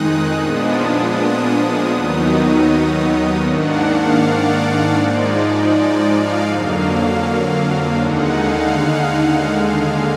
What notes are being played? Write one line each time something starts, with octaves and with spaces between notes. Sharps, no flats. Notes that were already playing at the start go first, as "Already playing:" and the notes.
Already playing: F2 D#3 G#3 D#4 D#6 F#6
A#2 F3 G#3 B3 D4
D#6
D#2 D#3 F#3 B3 D#4
G#2 D#3 A#3 D4 F#5
F5
D5
G#2 F3 G#3 D#4
D5
F5
F2 D3 F#3 A#3
D#2 D3 G#3 D#4 F#5
F5
F5
D#2 D3 G#3